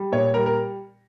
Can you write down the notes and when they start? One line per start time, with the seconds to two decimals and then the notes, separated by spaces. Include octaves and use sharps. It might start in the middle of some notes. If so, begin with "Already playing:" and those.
Already playing: G3
0.12 A#2 C#5
0.34 G3 A#4
0.46 A#4